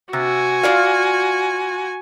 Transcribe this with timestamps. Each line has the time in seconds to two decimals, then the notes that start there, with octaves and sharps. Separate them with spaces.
0.13 C3 F#4 G#5
0.63 F4 D5 F5